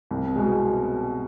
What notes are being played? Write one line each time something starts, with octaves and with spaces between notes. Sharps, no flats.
C2
B2 G#3